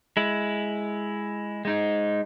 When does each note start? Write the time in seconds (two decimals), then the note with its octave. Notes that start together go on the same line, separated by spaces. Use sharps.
0.17 G#3 E4
1.65 G#3 D#4